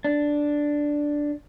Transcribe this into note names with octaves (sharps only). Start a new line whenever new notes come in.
D4